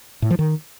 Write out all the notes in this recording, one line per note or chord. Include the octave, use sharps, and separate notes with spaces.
A2
F3
D#3